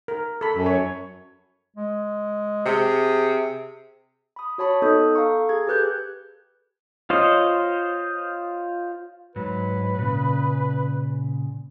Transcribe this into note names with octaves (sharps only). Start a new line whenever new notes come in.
A#4
A4 B5
F#2
C#5
G#3
C3 G#4
B5 D#6
F#4 C#5 A5 B5 C#6
B3 D#4 A4 D#5 D#6 G6
A4 F5 A#5 C#6
G#4 G#6
G4 A4 B4 F#6 G6
F4 C5 C#5 D#5
G#2 F#3 B4
A#2 C#3